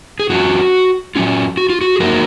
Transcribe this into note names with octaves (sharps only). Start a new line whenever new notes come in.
G#4
F#3 C#4 F4 F#4
F#3 C#4 F4
F#4
F4
F#4
G#4
F#3 A#3 D#4 F#4 A#4